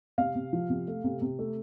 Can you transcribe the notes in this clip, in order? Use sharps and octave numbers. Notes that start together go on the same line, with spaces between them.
C3 F5
C3
F3
C3
A3
C3
C3
A3